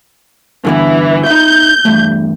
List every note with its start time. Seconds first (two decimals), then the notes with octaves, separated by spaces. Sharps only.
0.65 G2 D3 E3 B3
1.26 D#4 E5 G6
1.85 E2 G2 A3